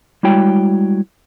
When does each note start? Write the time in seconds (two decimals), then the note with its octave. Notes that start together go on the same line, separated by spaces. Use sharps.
0.23 G3 G#3 E4 F#4 C#5 G5